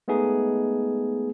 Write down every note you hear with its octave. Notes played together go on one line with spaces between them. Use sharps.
G#3 A3 B3 D#4 G#4